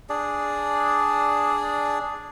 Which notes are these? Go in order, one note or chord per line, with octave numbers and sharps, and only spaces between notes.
D4 G#4 D5